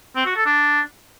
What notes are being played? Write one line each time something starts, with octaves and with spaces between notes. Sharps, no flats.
C4
F#4
A4
D4